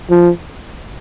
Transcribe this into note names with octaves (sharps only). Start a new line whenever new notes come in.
F3